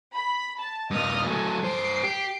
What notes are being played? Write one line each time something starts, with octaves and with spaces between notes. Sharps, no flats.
B5
A5
G2 A#2 D#5 D#6 F6
F#3 A3 A4 G#5
G2 C5 C7 D7
G4